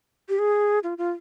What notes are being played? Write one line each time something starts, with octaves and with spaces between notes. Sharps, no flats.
G4
G#4
F4
F4